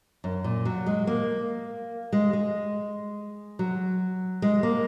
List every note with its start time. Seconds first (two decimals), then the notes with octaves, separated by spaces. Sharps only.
0.24 F#2
0.44 A#2
0.65 F#3
0.86 G#3
1.07 A#3
2.13 G#3
2.33 G#3
3.59 F#3
4.42 G#3
4.63 A#3